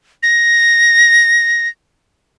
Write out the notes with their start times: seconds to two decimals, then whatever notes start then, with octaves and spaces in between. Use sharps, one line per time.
0.23 A#6